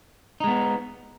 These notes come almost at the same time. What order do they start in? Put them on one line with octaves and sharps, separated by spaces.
D#4 G#3 B3